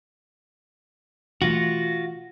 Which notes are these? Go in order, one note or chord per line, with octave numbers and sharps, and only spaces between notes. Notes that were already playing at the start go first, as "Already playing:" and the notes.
B2 E3 A3 F4 F#4 A#6